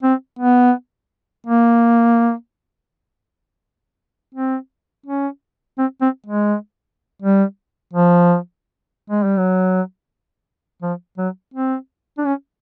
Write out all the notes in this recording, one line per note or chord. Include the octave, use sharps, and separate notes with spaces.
C4
B3
A#3
C4
C#4
C4
C4
G#3
G3
F3
G#3
G3
F#3
F3
F#3
C4
D4
C#4